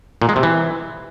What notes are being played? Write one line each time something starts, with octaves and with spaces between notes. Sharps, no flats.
A#2
G#3
C3
E3